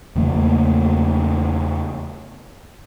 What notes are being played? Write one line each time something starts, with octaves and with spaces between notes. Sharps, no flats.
E2 C#3 A3 A#3